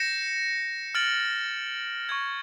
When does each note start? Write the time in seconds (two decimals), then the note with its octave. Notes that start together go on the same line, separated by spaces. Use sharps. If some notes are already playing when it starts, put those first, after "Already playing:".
Already playing: G6 A#6 C#7 E7
0.95 F6 A6 D7 F#7
2.09 C#6 F6 G#6